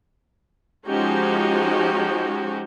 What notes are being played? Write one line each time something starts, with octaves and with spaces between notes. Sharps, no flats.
F3 G#3 C#4 D#4 F#4 G4